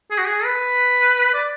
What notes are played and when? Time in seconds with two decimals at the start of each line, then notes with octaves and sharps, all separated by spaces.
0.11 G#4
0.18 F#4
0.25 G#4
0.45 B4
1.34 D5